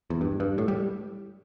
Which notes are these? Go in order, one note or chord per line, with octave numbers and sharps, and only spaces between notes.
E2
G2
G2
A2
G3